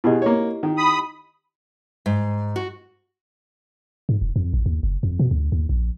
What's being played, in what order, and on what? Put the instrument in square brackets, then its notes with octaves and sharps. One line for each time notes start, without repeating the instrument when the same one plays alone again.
[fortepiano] B2 G#4 [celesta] E4 G4 D#5
[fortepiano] A#3 C#5
D#3
[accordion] B5 D#6
[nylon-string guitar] G#2
F#4
[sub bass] G#2
E1
F2
A1
D#2
F#1
F2
B2
D2
D#2
A#1